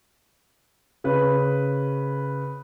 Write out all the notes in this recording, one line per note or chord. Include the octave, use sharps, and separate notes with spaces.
C#3 B4